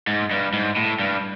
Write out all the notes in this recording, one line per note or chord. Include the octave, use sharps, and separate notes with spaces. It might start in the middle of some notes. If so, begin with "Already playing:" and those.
G#2
G2
G#2
A2
G2